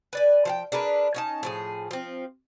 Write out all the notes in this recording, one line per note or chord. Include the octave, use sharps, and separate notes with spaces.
B4 D5 G#5
F3 F5 G5
D4 G#4 A#4 B4
C#4 D#4 A5
A2 F3 G#4
F3 C4